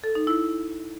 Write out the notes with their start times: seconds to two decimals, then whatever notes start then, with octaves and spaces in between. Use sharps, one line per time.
0.04 A4
0.15 D#4
0.27 E4